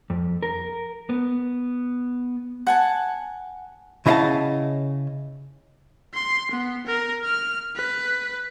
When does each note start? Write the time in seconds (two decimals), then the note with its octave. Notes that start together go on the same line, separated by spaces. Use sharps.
0.10 F2
0.43 A#4
1.09 B3
2.67 F#5 G#5 A5
4.06 C#3 E4 D#5 F5 F#5 A5
6.14 C6
6.51 B3
6.87 A#4
7.25 F6
7.76 B4